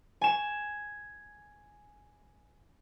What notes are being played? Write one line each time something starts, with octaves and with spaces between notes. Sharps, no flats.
G#5 E7